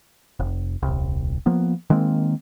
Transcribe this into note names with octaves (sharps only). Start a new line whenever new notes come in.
F1
D#1 C2
F3 A#3 B3
D#3 G#3 A#3 C4